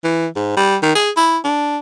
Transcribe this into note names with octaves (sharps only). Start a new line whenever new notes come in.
E3
G#2
G3
D#3
G#4
E4
D4